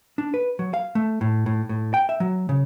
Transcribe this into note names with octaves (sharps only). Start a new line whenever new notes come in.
D4
B4
F#3
F5
A3
A2
A2
A2
G5
E5
F#3
C#3